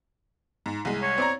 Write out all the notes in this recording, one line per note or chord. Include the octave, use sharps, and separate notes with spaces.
G#2
C2 G#3
C#5
C4 D5 A#5